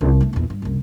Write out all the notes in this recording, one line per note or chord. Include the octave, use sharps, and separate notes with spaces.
C2
A3 D#4
A#1 E2
G2
F#1 C2